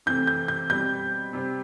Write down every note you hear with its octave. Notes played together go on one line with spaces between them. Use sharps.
C3 E3 A3 C4 G6
G6
G6
B2 G3 C4 G6
C3 G3 C4